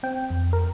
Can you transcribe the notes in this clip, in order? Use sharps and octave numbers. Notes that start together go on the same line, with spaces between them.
C4 G5
F2
A#4